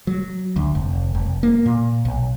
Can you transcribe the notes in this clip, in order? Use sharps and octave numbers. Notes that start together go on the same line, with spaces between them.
F#3
D2
F1
F1
A#3
A#2
B1